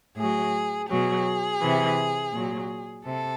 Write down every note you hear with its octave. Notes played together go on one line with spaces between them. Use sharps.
A2 F#3 G#4
B2 F#3 G#4
C3 E3
A#2 F#3
C3 A4